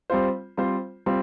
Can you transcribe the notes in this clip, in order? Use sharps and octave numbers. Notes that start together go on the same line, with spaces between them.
G3 C4 F4 C5
G3 C4 F4 C5
G3 C4 F4 C5